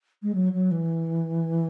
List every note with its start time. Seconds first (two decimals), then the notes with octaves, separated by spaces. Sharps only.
0.22 G#3
0.34 F#3
0.53 F#3
0.71 E3